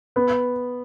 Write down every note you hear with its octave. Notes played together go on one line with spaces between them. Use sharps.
B3